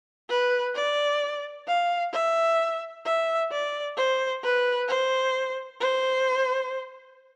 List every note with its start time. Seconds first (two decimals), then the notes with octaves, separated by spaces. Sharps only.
0.29 B4
0.75 D5
1.68 F5
2.13 E5
3.06 E5
3.51 D5
3.97 C5
4.43 B4
4.88 C5
5.81 C5